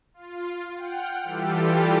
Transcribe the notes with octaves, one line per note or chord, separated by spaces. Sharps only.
F4
F#5 G5 F6
E3 G3 F4 G4 A4